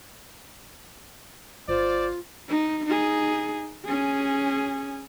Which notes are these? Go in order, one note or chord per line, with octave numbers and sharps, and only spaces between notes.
G#1 F4 C5 D5
D#4
D#4 G#4
C#4 G#4